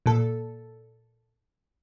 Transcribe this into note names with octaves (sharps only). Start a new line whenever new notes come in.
A#2 A4